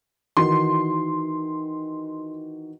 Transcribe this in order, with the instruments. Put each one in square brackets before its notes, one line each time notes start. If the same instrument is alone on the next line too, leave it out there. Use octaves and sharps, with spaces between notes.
[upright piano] D#3 E3 F#4 [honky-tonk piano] C6